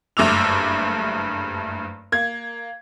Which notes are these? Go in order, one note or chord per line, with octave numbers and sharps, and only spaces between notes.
F#1 G2 A3 D6 E6 F7
A#3 G#6